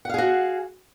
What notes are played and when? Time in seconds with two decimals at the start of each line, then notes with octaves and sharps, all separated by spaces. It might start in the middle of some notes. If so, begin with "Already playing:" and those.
0.05 F#5
0.09 F5
0.14 G#4
0.18 F#4